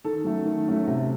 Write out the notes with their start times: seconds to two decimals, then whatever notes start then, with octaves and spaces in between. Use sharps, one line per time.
0.04 D#3 A4
0.24 F#3 A3 C#4
0.45 D#3
0.67 F#3 A3 C#4
0.87 C3